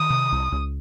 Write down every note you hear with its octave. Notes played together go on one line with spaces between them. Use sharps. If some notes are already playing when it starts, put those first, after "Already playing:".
Already playing: D#3 D#6
C3
C2
C#2